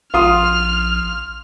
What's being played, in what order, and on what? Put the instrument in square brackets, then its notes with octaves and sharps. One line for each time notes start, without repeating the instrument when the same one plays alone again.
[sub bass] A#1 [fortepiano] F4 [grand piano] F5 C6 D#6 [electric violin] F6